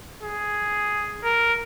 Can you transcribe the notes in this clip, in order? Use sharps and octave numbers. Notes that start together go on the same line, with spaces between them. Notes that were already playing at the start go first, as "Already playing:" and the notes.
G#4
A#4